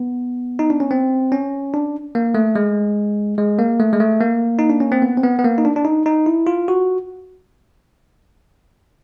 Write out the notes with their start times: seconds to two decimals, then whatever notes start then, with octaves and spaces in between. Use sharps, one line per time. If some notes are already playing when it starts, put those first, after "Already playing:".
Already playing: B3
0.59 D#4
0.70 D4
0.80 C#4
0.91 C4
1.32 C#4
1.74 D4
2.15 A#3
2.35 A3
2.56 G#3
3.38 G#3
3.59 A#3
3.80 A3
3.93 G#3
4.00 A3
4.21 A#3
4.59 D#4
4.70 D4
4.80 C#4
4.92 C4
5.02 B3
5.17 C4
5.23 B3
5.39 B3
5.44 A#3
5.58 D#4
5.65 D4
5.76 D4
5.85 D#4
6.06 D#4
6.26 E4
6.47 F4
6.68 F#4